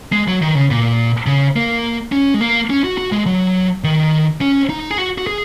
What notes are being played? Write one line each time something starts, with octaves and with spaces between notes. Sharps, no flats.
G#3
F#3
D#3
C#3
A#2
C#3
A#3
C#4
G#3
A#3
C#4
F#4
F#4
G#3
F#3
D#3
C#4
D#4
G#4
F#4
F#4
G#4